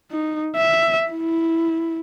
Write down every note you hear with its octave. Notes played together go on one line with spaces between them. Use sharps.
D#4
E5
E4